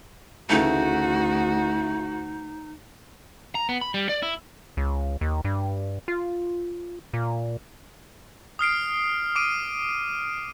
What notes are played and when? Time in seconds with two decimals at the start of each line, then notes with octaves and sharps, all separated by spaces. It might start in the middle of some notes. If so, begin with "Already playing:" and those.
0.50 D2 C#3 E3 A3 D#4 F#4
3.55 A#5
3.69 B3
3.81 B5
3.94 G3
4.09 D5
4.23 E4
4.77 C#2
5.21 D#2
5.45 G2
6.08 F4
7.13 A#2
8.59 D#6 F6 C7 D7
9.36 D6 D7 D#7